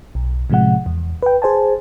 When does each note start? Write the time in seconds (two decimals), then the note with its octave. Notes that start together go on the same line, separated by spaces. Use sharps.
0.15 B1
0.50 A2 C3 F3 G#3 F#5
0.86 E2
1.23 B4 G5
1.42 G#4 C5 G#5 A5